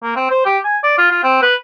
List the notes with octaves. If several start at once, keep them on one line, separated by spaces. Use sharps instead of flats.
A#3
C4
C5
G4
G#5
D5
F4
F4
C4
B4